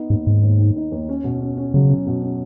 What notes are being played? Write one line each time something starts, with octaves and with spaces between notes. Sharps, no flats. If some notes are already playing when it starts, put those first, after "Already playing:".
Already playing: B3 D#4
D#2 G#2
G#2 D#3
D#2
D#3
D#4
D#2
C#4
B2
C#4
C#4
C#3 F#3
C#4
B2
C#4